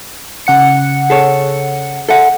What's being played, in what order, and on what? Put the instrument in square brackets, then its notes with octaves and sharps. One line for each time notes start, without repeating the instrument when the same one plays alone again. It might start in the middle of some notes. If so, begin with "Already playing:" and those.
[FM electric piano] C#3 F#5 C#7
[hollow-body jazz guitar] G#4 A4 C#5
A4 E5 F#5